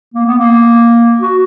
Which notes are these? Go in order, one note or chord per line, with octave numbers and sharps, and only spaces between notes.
A#3
B3
A#3
F#4